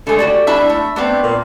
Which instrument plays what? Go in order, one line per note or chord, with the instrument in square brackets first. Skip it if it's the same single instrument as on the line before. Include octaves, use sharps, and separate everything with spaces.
[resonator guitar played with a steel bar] D3 G#3 [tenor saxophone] A3
[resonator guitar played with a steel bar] F#4 G4 D5
[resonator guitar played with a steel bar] G3 D4 E4 [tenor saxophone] E5
[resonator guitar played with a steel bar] A3
[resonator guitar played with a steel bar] A3 B3 C4 [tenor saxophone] D4
[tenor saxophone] A#2